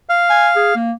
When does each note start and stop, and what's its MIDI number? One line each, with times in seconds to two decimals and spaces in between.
0.09 0.75 77
0.30 0.49 80
0.56 0.72 68
0.75 0.92 58